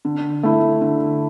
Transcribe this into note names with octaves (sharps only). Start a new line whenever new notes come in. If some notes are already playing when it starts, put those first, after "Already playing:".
D3
A3 E4
D3